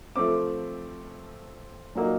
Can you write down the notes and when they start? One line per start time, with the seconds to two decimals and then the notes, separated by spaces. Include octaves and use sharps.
0.16 F3 A3 C4 D6
1.95 A#2 F#3 A#3 D#4